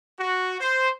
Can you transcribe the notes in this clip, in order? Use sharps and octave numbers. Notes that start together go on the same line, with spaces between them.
F#4
C5